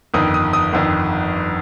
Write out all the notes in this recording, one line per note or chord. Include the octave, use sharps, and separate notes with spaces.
G1 F2 D#3 D#6
D#6
D#6
G1 F2 D#3